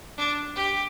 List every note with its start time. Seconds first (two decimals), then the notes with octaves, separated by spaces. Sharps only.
0.18 D4
0.56 G4